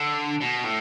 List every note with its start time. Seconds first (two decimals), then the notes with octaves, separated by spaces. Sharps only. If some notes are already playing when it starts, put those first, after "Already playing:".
Already playing: D3
0.40 B2
0.64 A2